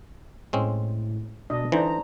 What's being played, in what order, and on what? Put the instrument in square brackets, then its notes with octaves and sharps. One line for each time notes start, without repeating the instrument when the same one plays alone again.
[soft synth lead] A2 [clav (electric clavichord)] G#3 C4 C#4
[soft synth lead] B2 [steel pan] D4 D#5
[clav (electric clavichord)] D3 E3 [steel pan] D4 D#4 C5 [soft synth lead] A#5